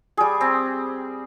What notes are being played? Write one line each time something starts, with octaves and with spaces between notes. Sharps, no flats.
G3 G#4
C4